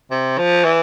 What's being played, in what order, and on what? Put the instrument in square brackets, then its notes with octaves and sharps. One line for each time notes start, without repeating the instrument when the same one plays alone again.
[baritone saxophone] C3
F3
E3